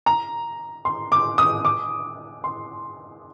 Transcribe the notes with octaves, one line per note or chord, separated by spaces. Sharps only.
A#5
C6
D6
D#6
D6
C6